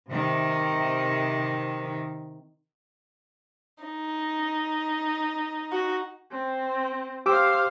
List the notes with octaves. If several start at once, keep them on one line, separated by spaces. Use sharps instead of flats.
C3 D#3
D#4
F#4
C4
G4 C5 F5 D6 E6